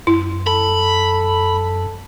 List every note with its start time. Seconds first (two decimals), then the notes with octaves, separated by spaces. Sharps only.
0.07 F#2 E4
0.47 A4 B5